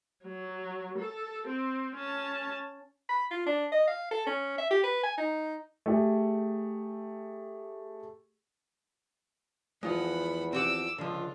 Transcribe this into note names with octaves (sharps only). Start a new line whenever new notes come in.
F#3
A4
C4
C#4 A5
B5
F4
D4
D#5
F5
A4
C#4
E5
G4
B4
G#5
D#4
A3 G4 G#4
E2 F3 G#3 F4 B4 F#5 B5
C4 G4 F#5 D6 E6
C#2 D3 F3 F4